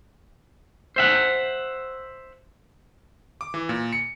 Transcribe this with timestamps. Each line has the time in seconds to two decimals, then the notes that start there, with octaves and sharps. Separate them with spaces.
0.96 C5 E5 F#5
3.41 D6
3.54 E3
3.69 A#2
3.93 C#7